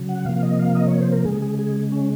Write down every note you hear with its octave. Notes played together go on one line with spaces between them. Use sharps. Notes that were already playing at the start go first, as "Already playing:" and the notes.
Already playing: C#3 F#3
F#5
C3 F3 A#3 F5
D#5
F5
D#5
C#5
C5
A#4
C#3 G#3 G#4
G#4
G#4
C#4